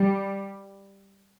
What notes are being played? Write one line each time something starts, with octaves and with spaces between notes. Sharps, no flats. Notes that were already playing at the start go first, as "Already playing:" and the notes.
Already playing: G3